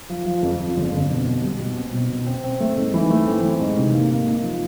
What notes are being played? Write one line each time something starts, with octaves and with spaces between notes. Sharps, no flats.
F3
F3
F2
F3
G1
F2
B2
B2
G3
B2
C4
B2
B2
C4
C4
A3
G#2
E3
A3
C4
E3
G#2
C3
A#3
A#3
D#4
F3